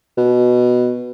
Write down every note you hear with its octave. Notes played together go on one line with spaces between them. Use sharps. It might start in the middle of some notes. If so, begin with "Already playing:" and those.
B2